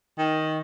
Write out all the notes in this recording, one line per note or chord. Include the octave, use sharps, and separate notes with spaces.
D#3